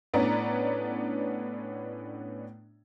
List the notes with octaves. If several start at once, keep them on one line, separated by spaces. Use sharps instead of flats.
A2 B3 C#4 D4 D5 A#5